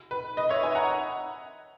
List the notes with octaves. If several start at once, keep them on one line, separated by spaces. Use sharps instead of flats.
B4
B4 D#5
C#5 E5
E5 G#5
F#5 A#5